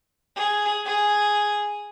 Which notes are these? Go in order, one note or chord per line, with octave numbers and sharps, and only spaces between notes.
G#4
G#4